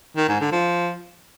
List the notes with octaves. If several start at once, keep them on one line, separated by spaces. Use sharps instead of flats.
D#3
G#2
D3
F3